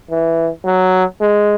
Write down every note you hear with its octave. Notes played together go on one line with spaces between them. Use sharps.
E3
F#3
G#3